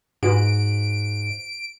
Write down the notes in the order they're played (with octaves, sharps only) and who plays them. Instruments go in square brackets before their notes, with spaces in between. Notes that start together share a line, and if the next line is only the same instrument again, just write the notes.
[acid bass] G#2 [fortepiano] F#4 B4 [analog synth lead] D7